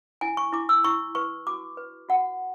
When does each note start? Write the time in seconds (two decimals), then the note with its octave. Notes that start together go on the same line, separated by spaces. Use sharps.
0.21 E4 G#5
0.37 C#6
0.52 E4 D6
0.69 E6
0.84 E4 C#6
1.15 B4 C#6
1.47 F#4 D6
1.77 B4
2.09 F#4 F#5